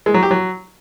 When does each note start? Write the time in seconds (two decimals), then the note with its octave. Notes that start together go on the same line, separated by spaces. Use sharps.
0.06 G#3
0.14 F#3
0.23 G4
0.31 F#3